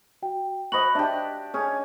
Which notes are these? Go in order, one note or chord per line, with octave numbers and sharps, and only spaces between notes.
F#4 G5
F#4 C5 D#5 B5 F#7
D4 G4 E5
C#4 G#4